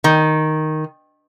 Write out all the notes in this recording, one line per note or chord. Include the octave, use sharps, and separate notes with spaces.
D#3